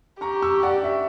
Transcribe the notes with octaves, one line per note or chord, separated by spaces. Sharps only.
G4 A#5 C#6
C#6 E6
D5 F#5
E5